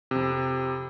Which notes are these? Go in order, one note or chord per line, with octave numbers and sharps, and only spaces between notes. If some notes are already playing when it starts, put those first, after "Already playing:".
F2 C3